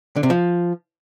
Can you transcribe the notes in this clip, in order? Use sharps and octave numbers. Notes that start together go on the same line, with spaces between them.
D3
C3
F3